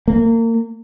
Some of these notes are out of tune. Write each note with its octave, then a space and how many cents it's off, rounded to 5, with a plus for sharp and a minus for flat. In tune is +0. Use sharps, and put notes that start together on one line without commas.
A#3 -30